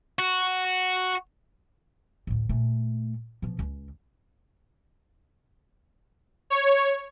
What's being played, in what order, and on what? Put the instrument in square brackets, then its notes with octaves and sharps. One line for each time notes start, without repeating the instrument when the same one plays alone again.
[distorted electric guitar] F#4
[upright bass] D2 A2
A#2 A3
B2 F3
C#2
[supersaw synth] C#5